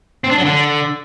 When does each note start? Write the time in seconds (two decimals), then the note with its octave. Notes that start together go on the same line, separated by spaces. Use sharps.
0.24 C4
0.31 D4
0.38 F#3
0.44 D3